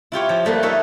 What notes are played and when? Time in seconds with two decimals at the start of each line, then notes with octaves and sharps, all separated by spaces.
0.12 E4 F4 G4 C#5
0.29 F3
0.45 G3 A3 A#3 B4
0.63 D#4 A4 C#5 E5